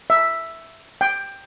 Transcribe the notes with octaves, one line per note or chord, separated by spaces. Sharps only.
E5
G5